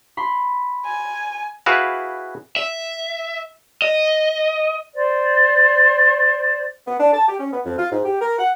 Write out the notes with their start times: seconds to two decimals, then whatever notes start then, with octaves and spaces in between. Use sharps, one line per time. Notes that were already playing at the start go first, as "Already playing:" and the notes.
0.17 B5 C6
0.86 G#5
1.66 E4 F#4 G#4 B4 F5
2.56 E5
3.82 D#5
4.94 C5 D5
6.87 B3
7.00 D4
7.13 A5
7.28 G4
7.39 C#4
7.52 B3
7.65 F2
7.78 F4
7.92 G#2
8.05 G4
8.21 A#4
8.39 F#5